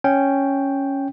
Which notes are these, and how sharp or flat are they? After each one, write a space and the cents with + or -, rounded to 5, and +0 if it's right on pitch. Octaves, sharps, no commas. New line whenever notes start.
C#4 +0 G5 +0